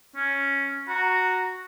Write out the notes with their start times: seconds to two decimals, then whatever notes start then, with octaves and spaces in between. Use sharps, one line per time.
0.16 C#4
0.89 F#4 A#5